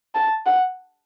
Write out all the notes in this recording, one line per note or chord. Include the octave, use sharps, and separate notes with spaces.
A5
F#5